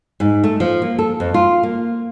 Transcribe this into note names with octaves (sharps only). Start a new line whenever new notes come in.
G#2
A3
F3
A#3
A4
F2
F4
A#3